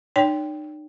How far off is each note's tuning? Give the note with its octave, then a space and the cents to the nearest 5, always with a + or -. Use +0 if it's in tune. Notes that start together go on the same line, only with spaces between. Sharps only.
D#4 -40 C#5 +40 G5 +0